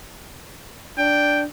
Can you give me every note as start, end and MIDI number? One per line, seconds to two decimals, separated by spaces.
0.98 1.44 62
0.98 1.42 79